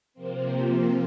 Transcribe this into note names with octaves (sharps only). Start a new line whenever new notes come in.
C3 F3 A#3 C4